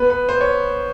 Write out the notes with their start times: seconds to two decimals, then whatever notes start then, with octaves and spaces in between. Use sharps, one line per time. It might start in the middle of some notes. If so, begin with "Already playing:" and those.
Already playing: B3 B4
0.10 B4
0.29 C5
0.41 C#5